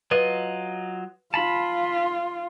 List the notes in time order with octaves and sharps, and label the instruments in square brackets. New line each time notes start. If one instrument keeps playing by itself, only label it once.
[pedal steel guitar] F#3 F4 D#5 [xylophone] B4
[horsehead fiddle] F4 [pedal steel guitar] A5 B5